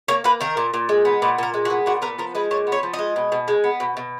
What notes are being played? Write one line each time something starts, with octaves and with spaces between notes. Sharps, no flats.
A#3 C#5
A#3 B4
D#3 A#4
A#2
A#2
G#3
B3
A#2 B4
A#2 A#4
G#3
F#4
B3
A#2 F#4
B3 A#4
F3 A#4
G#3 B4
A#2 C#5
B3
C#5
F3
D#5
G#3
B2
B2
G#3
B3
B2
B2